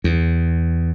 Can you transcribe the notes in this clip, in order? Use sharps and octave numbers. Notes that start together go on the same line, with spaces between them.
E2